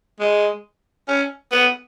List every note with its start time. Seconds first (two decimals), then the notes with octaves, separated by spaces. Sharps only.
0.20 G#3
1.08 C#4
1.52 B3